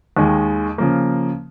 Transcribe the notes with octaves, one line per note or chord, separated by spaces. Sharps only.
D#2 D#3 G#3
C#3 F3 A#3